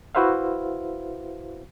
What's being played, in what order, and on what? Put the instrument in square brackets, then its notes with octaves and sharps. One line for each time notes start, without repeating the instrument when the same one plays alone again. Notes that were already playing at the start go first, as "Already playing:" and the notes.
[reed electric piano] E4 F#4 B4 C5 E5 F5